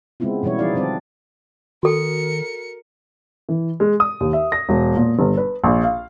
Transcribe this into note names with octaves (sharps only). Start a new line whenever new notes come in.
C#3 G#3 B3 C4 E4 F4
B2 E3 G3 E4 C#5
F3 D#4 E4 G#4 D5 F5
D3 G3 C4 D4 D5
D#3 F#4 A4 A#4 C#7
E3
G#3
D#6
D#2
E5
A#6
E1
A#2
G1
B4
A#1
F5